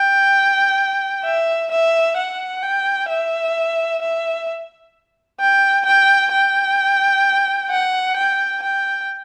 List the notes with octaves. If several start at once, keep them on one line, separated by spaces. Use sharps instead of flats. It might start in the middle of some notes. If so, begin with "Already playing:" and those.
Already playing: G5
E5
E5
F#5
G5
E5
E5
G5
G5
G5
F#5
G5
G5